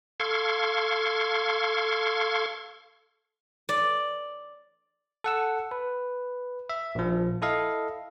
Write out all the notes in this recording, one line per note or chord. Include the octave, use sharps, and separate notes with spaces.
A4 F5 C6 C#6 G#6
D5
A4 F#5 E6
B4
E5
A#1 F3
E4 A4 D#5 F5